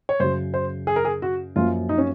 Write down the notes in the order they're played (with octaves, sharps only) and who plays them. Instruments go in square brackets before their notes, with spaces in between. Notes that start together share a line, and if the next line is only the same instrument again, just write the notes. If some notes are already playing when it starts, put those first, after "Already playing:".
[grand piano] C#5
[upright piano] F#2 C#3 F#3 [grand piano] C5
[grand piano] C5
G#4
A#4
G#4
F#4
[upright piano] F#2 F3 A#3 [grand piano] F4
[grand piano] D#4
C#4